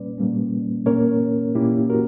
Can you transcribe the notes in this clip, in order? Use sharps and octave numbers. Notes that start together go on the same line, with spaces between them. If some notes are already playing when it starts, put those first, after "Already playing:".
Already playing: A#2 G3 A#3 C#4 B4 D5
A#2 G3 A#3 C#4
A#2 A#3 C#4 A#4 C#5
A#2 A#3 C#4 E4 G4
F#4 A#4